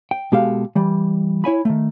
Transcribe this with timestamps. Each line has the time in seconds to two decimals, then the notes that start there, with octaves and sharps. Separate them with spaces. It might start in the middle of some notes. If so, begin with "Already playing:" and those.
0.11 G5
0.32 B2 G#3 G4 A4 F5
0.75 E3 G3
1.44 E4 C#5 G#5 B5
1.65 D#3 A3